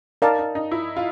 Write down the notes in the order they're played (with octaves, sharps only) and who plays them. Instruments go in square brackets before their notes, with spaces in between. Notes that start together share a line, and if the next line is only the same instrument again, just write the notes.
[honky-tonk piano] D#4 [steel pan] A#4 D5 F5 A5
[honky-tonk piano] D#4
D#4
E4
F4